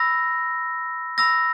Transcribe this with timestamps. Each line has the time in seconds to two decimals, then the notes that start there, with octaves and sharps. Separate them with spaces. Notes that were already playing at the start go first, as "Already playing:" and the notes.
Already playing: B5 E6 A#6
1.18 B5 E6 A#6